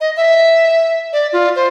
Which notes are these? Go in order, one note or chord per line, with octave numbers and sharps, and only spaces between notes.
D#5
E5
D5
F4
C5